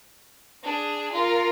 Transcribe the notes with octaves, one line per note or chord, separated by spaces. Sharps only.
D4 G#4
F4 A#4